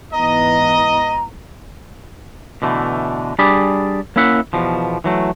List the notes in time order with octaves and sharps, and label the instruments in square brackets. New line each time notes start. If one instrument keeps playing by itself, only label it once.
[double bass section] G#2 E3 B3 [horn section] D#5 [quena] A#5
[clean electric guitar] B2 D3 E3 A3
G3 D4 G4 G#4 D5 B5
A#3 C#4 E4 E5 F#5
E2 B2 F3
E3 F#3 A3